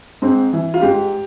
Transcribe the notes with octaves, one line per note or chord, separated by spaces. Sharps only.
G#2 C4
E3
F4
G#2 G4